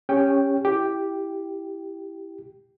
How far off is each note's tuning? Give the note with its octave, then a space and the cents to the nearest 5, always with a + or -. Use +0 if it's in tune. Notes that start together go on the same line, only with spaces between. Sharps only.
C#4 +0 G4 +25 G5 +0
E4 +0 G4 +0